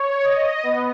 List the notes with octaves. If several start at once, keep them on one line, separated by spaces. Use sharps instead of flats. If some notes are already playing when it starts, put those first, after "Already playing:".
Already playing: C#5
D#5
B3